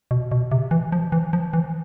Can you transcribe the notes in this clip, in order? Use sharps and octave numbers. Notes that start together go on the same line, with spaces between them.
B2
B2
C3
E3
F3
E3
F3
E3